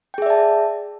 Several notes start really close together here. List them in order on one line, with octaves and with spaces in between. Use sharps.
G5 G#4 E5 D5 A5